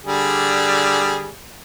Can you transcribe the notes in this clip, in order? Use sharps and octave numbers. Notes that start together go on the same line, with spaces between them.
D3 G3 G#4